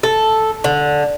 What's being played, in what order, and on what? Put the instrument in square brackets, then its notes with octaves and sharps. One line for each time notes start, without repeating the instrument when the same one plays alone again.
[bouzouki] A4
D3